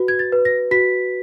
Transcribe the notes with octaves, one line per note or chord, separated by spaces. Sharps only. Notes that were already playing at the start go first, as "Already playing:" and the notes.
Already playing: F#4 B4
G#6
A6
B4
A#6
F#4 B6